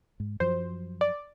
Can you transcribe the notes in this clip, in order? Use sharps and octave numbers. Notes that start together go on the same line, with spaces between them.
G#2
F#2 F3 F#3 C5
D5